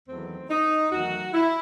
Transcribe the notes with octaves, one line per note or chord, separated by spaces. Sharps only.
E2 D#3 F#3 A3 C4
D#4
E2 D#3 F#3 A3 F#4
E4